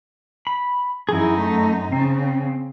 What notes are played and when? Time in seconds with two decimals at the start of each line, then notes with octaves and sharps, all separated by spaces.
0.47 B5
1.09 F#2 D#4 E4 G#4
1.38 A3
1.92 C#3 C4